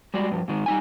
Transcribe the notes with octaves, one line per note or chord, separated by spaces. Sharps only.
G3 G#3 F#4 D5
G2 F3
G#2 D#3 G#3
G3 D#4 G#5